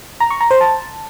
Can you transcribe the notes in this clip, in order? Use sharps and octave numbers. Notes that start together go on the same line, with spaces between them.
A#5
C#6
A#5
C5
A5